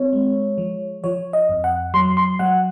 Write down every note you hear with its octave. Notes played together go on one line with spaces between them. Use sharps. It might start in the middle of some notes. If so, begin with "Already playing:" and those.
Already playing: C4 C#5
G#3
F3
F3 C#5
D#5
F2
F#5
F#3 C6
C6
F#3 F#5